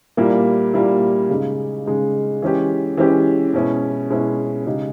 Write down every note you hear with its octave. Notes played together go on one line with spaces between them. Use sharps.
A#2 G3 A#3 E4
A#2 G3 A#3 E4
C#3 G#3 D#4
C#3 G#3 D#4
E3 G#3 C#4 G4
E3 G#3 C#4 G4
B2 G#3 C#4 E4
B2 G#3 C#4 E4
C#3 G#3 D#4 G4